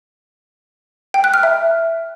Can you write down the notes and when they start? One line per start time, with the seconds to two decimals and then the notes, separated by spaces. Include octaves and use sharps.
1.14 G5
1.24 F#6
1.34 F6
1.43 E5